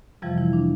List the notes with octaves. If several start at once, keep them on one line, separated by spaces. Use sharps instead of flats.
F2 C3 E3 F3 G3 F4
E3 E4
D4